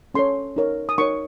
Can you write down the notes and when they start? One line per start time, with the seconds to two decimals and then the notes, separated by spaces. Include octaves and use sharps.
0.14 C#4 A4 C#5 C6
0.56 D#4 A#4 C#5
0.89 D#6
0.98 D#4 A#4 C#5 C#6